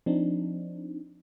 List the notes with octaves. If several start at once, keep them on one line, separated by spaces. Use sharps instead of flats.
F3 C4 D4 D#4